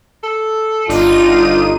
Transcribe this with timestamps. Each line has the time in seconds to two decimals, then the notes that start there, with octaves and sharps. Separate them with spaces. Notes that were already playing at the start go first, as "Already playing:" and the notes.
0.23 A4
0.89 G1 D4 D#4 F4 D#7